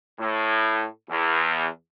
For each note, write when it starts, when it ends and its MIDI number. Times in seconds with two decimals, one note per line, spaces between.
0.19 0.86 45
1.09 1.68 40